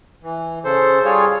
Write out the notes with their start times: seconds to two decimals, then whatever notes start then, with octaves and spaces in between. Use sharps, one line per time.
0.23 E3
0.65 C#3 A4 C5
1.05 G3 F4 G#4 C#5